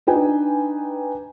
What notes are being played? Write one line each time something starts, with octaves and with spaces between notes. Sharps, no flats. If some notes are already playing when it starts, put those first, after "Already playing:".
D4 D#4 B4 G5 G#5